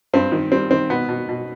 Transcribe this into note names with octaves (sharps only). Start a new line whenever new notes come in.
G2 C4
D#3
G3 C4
D#3 C4
B2 B3
B2
B2